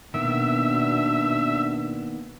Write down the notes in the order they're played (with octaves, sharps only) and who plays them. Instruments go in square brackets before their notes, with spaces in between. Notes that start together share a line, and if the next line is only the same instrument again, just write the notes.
[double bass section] B2 [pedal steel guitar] D#3 A#3 B3 [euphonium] D4 [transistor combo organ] E5